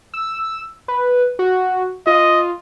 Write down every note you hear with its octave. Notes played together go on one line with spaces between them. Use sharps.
E6
B4
F#4
F4 D#5